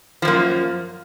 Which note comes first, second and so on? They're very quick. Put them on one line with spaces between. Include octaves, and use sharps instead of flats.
F3 F#2 A#3